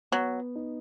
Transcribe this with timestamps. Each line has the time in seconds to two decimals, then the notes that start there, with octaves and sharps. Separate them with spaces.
0.12 F#3 B3
0.56 D#4